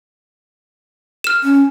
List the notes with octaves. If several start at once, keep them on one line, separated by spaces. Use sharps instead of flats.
F6 E7
C#4